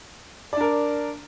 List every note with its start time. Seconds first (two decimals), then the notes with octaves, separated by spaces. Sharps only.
0.53 D5
0.57 D4
0.61 A#4